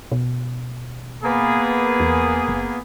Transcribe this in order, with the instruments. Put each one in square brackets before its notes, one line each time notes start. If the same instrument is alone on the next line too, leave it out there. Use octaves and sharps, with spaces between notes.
[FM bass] B2
[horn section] A#3 B3 G#4
[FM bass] E2
F#1